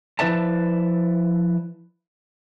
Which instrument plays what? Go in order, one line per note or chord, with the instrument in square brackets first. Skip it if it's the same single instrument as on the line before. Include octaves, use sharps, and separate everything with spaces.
[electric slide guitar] F3 E4 B4 D5 E5 A5